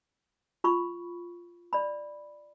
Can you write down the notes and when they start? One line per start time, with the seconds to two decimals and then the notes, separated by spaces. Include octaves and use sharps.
0.64 F4 B5 C#6
1.73 D5 B5